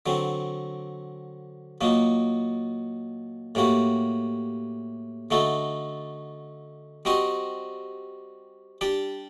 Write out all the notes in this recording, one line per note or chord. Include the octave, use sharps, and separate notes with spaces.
D3 F#3 C4
A#2 F#3 A#3 D#4
A2 G3 A#3 F#4
D3 A3 D#4 F#4 A4
G3 C4 F#4 C5 D#5
G3 D4 G4 D5